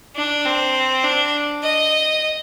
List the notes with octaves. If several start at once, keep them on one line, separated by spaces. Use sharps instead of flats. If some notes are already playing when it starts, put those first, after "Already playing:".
D4
C4
D4
D#5